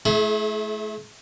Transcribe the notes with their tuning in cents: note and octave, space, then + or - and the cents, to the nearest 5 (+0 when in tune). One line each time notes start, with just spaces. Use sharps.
A3 -30 E4 +0 G#4 +40